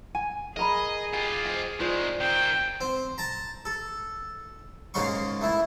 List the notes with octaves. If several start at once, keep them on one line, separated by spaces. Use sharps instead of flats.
G#5
G#4 A#4 D#5 A#5 B5
F4 G4 G#5
C5 D#5
D#3 G#3 F4 C5 D5
D#3 C4 G5
C4
A5 A#5
A4
G#2 C#3 A#3 F5 C6 C#6
A3 E4